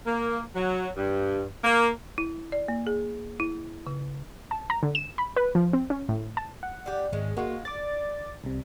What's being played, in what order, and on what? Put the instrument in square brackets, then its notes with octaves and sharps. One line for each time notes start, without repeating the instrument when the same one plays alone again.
[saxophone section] A#3
F#3
G2
A#3
[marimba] E4
D5
A#3
G#4
E4
C#3
[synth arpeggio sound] A5
A#5
D3
E7
B5
B4
F3
C4
C#4
A2
A5
[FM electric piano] F#5
[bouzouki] G3 G4
[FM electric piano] G#1 [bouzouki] G#3 C#4
[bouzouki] G#3 F4 [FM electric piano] A#3 F#4
[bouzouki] D5 [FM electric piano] D6 A6
[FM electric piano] C2 C3